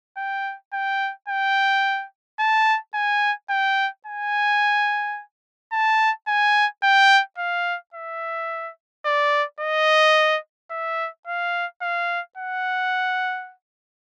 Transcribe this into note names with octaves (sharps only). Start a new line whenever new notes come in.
G5
G5
G5
A5
G#5
G5
G#5
A5
G#5
G5
F5
E5
D5
D#5
E5
F5
F5
F#5